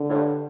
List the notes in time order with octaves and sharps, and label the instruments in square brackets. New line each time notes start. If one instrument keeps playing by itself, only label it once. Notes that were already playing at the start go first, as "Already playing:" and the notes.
Already playing: [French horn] D3
[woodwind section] A2
G2